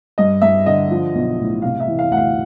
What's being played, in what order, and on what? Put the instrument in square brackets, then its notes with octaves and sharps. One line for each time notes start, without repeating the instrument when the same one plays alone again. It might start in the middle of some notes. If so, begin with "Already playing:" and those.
[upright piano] G2 D#5
G2 E5
D3 D#5
F3
B1
A2
C3 F5
E5
E3
F5
D2 F#5
F5